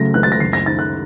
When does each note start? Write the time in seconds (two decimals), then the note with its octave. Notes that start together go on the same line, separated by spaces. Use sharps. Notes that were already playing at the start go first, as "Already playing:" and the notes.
Already playing: C#3 F#3 A3 A#6
0.14 C#2 F#6
0.23 A6
0.32 A#6
0.40 F#1 C7
0.53 A#6
0.66 D#3 A6
0.79 F#6